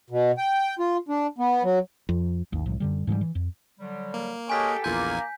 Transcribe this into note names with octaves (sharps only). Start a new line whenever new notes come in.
B2
G5
F4
D4
B3
F#3
F2
G#1 D#2
C2 A2 F3
F#2 D3 G3
G#2 E3 F#3 G3
E3
F2
D3 F#3 G3
A#3
G#3 C#4 G4 A4 G5 G#5 B6
A#1 E2 A#3 F4 A4 G#5 G6